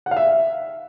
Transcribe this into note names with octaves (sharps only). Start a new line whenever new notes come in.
F#5
F5
E5